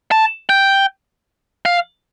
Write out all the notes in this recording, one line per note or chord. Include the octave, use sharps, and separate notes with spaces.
A5
G5
F5